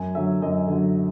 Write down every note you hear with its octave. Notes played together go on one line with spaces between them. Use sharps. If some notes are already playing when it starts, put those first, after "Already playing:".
Already playing: F#2 G#5
D3 F#3 E5
F#2 D#5
D3 F#3